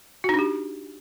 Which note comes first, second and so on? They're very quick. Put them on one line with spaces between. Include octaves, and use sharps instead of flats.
F#4 D#4 D4 G4